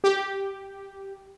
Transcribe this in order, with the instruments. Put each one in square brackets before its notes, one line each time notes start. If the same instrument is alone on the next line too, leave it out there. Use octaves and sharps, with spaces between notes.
[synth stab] G4